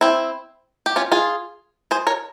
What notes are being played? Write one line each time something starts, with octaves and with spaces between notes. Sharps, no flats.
C4 E4
G4
C#4 F4
F4 G#4
G#4 C5
A#4 C#5